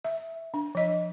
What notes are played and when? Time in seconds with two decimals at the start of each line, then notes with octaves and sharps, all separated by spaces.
0.04 E5
0.54 D4
0.75 F3 D#5